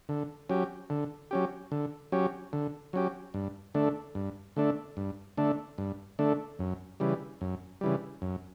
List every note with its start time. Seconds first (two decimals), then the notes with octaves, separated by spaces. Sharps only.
0.09 D3
0.49 F#3 C#4 G4
0.90 D3
1.31 F#3 C#4 G4
1.72 D3
2.12 F#3 C#4 G4
2.53 D3
2.93 F#3 C#4 G4
3.34 G2
3.74 D3 A3 D4
4.15 G2
4.56 D3 A3 D4
4.97 G2
5.37 D3 A3 D4
5.78 G2
6.19 D3 A3 D4
6.59 F#2
7.00 C#3 E3 G3
7.41 F#2
7.81 C#3 E3 G3
8.22 F#2